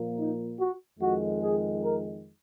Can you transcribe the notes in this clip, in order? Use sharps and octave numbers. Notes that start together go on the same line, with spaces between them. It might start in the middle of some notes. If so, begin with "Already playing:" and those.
Already playing: A#2 F3 A#3
D#4
F#4
F2 D#3 G#3 F#4
G#4
A#4